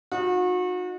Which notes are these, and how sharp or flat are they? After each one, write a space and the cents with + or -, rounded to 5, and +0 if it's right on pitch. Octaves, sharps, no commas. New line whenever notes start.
D#4 +0 F#4 -35